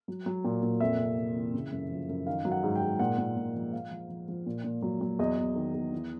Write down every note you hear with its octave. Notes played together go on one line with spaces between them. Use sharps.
F#3
F#3
A#2
A#2
F2 E5
C3
C3
E3
C#3
F#2
F3
F#2
D#3 F5
F#3
F#5
G#2
G5
G#2
A#2 F#5
A#2
A#2
F3
F3 F5
F3
F3
F3
A#2
A#2
F#3
F#3
E2 D#5
E2
D#3
E2
E3